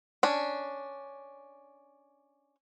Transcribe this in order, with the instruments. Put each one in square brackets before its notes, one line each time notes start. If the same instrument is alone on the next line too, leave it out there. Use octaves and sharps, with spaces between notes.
[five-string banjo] C#4 D4